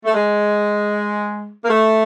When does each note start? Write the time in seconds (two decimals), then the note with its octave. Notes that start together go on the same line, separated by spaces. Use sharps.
0.03 A3
0.14 G#3
1.64 A#3
1.69 A3